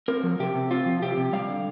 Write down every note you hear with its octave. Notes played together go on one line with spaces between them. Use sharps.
C4 A#4
F3
C3 G4
C3
C4 F4
F3
C3 G4
C3
G3 F5
D3